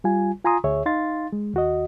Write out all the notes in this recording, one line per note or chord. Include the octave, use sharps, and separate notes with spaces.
G3 F4 G#5
F4 G#5 A#5 C6 D#6
D2 G#4 C#5 E5
D#4 F5 C6 A6
G#3
D#2 F#4 D#5